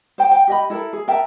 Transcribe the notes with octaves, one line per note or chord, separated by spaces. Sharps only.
C5 G5
G5
G4 D#5 B5
E4 A4 A#4
G#4
A#4 E5 G5 A5